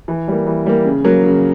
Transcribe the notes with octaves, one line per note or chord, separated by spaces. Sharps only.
E3
G3 A#3
E3
G3 A#3
C#3
F#3 A#3
C#3